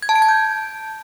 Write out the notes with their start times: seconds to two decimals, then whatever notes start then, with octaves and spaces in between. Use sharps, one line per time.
0.02 G#6
0.09 A5
0.16 D7
0.22 G#6
0.29 G6